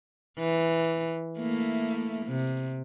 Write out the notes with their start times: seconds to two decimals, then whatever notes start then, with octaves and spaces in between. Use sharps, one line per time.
0.38 E3
1.39 A3 A#3 E4
2.26 C3